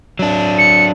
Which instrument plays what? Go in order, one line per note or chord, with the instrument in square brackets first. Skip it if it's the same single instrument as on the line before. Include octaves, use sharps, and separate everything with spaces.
[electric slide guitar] F#3 D4
[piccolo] C#7